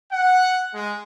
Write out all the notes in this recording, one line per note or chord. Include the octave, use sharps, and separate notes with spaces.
F#5
G#3